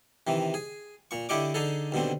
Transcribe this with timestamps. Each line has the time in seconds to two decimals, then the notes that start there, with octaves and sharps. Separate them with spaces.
0.27 C3 D#3 E3
0.54 G#4
1.11 A#2 C#6
1.29 D3 E4 G4 D#5 C#6 D6
1.54 D3 D#4 G#4 A4
1.92 D#2 B2 D3 C4